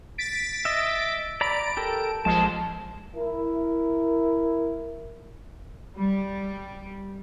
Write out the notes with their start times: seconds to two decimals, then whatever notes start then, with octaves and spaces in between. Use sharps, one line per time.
0.18 A6 B6 D7
0.65 D#5 E5
1.41 D5 A#5 B5 D7
1.77 G4 A4 A#4
2.25 A#1 F3 G#3 A5
3.16 E4 A#4
5.96 G3